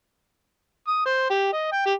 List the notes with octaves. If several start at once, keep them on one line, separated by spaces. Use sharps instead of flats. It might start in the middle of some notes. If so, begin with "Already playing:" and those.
D#6
C5
G4
D#5
G5
G4